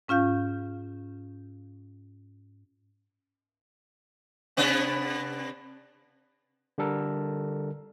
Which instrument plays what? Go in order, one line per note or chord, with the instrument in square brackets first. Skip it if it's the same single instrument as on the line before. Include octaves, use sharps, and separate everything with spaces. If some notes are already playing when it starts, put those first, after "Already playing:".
[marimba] G#2 C#4 F4 F5 G6
[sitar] C3 B3 D4
[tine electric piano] D3 G3 A4 A#4